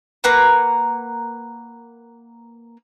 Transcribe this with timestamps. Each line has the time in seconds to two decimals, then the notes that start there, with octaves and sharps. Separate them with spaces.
0.24 A#3 B4 F#5 A#5